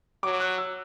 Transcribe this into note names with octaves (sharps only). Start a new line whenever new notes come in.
F#3 D6
F#6
E6